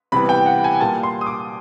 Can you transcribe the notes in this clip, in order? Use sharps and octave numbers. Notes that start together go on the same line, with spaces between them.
C3 E3 G3 B3 B5
G5
F#5
G#5
A#2 G3 A#3 A5
C6
D#6
D6